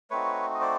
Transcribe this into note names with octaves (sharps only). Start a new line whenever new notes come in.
A3 C4 D#4 F#4 B4 C#5
D#5
C5 D5